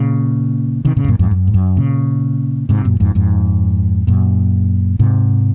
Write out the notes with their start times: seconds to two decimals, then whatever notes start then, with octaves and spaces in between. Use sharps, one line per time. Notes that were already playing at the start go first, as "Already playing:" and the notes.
Already playing: A#2 C#3
0.85 C3 D#3
0.97 A#2 C#3
1.04 G#2
1.08 F#2 A#2
1.19 F2 G#2
1.31 F#2
1.47 G#2
1.54 F#2
1.77 A#2 C#3
2.69 G#2 C3
2.85 F#2 A#2
3.00 F2 G#2
3.15 F2 G#2
4.07 F#2 A#2
4.99 G#2 C3